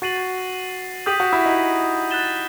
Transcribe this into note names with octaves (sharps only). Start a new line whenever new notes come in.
F#4 A6 C7 D#7 F#7
G4 D#6 G6 B6 D#7 F#7
F#4
E4
D#4
F#6 A6 E7 G7